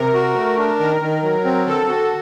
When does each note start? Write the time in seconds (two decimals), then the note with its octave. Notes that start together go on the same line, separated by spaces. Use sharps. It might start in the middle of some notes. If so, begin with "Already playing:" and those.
Already playing: C3 A#4
0.14 F#4
0.36 A3
0.58 D4
0.79 D#3 A#4
1.01 D#3
1.23 F#3
1.44 C4
1.67 D3 A4
1.88 F#4